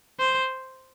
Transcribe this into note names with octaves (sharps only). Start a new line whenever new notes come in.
C5